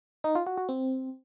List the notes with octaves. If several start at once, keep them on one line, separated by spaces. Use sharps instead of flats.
D#4
F4
F#4
F#4
C4